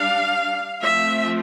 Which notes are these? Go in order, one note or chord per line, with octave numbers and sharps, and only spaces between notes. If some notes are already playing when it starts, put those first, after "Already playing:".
Already playing: G3 D4 F5
F3 A3 C4 E5